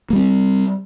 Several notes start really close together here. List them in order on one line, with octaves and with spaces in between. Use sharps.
A#3 G3 C4